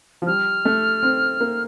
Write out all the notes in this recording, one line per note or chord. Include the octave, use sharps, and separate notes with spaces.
F3
G3 F6
A3
C4
A#3